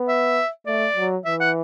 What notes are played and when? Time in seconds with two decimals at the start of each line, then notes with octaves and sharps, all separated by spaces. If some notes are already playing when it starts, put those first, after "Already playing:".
Already playing: B3
0.08 E5
0.66 A3 D5
0.96 F#3
1.25 E3 E5
1.40 F#5